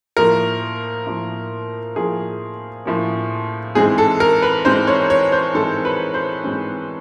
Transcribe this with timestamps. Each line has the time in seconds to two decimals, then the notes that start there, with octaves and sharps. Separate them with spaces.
0.17 A2 F3 A#3 A#4
1.06 A2 F3 A#3
1.96 A2 F3 A#3 G#4
2.85 A2 F3 A#3
3.75 G#2 E3 G#3 C4 G#4
3.98 A4
4.20 A#4
4.42 B4
4.65 G#2 E3 G#3 C4 C5
4.87 C#5
5.10 C#5
5.32 C5
5.55 G#2 E3 G#3 C4 A4
5.85 B4
6.14 C5
6.44 G#2 E3 G#3 C4